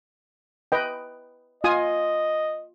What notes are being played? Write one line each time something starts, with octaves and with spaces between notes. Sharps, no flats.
B4 D#5 G5
F4 D#5 G#5 D#6